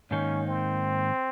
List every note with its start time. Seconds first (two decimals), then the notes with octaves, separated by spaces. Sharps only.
0.11 G#2 D#3 A#3 C#4 D#4
0.47 C4